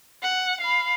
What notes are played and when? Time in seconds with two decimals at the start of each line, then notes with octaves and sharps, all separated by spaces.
0.23 F#5
0.61 F5 B5